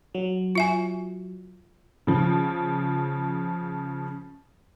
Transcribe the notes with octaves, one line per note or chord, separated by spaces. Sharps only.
F#3
F4 E5 G#5
C#3 F3